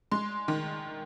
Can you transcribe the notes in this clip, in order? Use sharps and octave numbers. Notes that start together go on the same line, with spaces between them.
G#3 C6
D#3